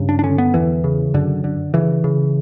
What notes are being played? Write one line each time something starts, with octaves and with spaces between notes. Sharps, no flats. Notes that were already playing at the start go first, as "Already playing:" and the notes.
Already playing: G2 C#3
D4
D4
D3 C#4
B3
E2 E3
C#3
F#2 D3
D3
C#3 E3
C#3